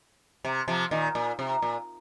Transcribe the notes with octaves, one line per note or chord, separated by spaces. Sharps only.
C3
C3 F3
A#2 D#3
A#2
C3
A#2